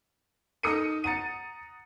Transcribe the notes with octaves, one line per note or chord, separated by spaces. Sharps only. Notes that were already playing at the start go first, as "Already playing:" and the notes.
D#4 A4 A#4 D#6 C#7 D#7
F#5 A#5 A6 C#7 D#7